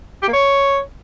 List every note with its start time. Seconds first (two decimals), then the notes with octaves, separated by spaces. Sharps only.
0.23 G4
0.28 A#3
0.33 C#5